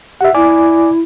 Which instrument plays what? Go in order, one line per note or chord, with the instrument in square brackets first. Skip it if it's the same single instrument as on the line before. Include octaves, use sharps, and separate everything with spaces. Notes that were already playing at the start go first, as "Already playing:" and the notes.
[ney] G4 [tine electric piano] E5 F#5
[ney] E4 [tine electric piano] D5 G#5 D6